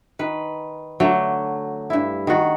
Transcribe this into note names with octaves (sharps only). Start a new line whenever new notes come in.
D#3 B4
D3 F#3 A3
G2 E4
D#3 F#4